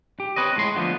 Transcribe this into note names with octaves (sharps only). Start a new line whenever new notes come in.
G4
C4 B4 C#5 D#5
A2 G#3 C6
D3 F3 A3 B3